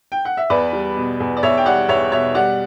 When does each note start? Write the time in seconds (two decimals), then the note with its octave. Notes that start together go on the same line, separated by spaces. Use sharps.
0.12 G5
0.25 F#5
0.37 E5
0.50 E2 B4 D5
0.73 G3
0.97 B2
1.20 E2
1.37 D5
1.43 E2 C#5 E5
1.58 G5
1.66 G3 D5 F#5
1.88 E2 C#5 E5
2.12 B2 C#5 E5
2.35 G3 D5 F#5